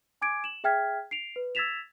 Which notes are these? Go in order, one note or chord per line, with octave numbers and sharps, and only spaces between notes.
G#5 D6 G#6 D7
E7 F#7
G#4 E5 G5 F6 G#6 B6
C7 D7 F7
B4
E6 G#6 A6 B6 E7 F7